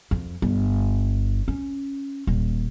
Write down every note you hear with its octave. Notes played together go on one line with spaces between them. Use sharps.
F2
G1
C#4
D#1